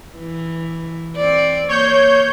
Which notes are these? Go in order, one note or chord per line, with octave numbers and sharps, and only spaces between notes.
E3
C4 D5
A#3 C#5 G6